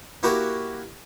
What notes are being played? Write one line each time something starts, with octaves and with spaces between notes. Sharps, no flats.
A#3 E4 F#4 G4 A#4